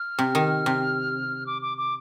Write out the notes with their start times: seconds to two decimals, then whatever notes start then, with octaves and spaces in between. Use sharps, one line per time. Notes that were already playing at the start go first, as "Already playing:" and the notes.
Already playing: F6
0.19 C3
0.35 D#3
0.66 C3
1.47 D6
1.62 D6
1.78 D6